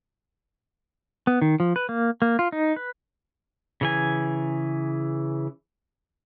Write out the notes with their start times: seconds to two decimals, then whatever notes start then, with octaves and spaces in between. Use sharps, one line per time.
1.27 B3
1.42 D#3
1.60 F3
1.76 B4
1.89 A#3
2.22 A#3
2.39 F4
2.52 D#4
2.76 B4
3.81 C#3 E3 G#5